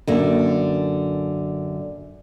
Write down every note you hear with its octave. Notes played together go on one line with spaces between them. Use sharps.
F#2 D3 A#3